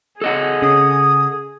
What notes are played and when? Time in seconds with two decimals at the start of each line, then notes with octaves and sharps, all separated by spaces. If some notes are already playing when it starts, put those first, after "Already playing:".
0.22 G#4 A4 D#5 F#5
0.62 C#3 D#6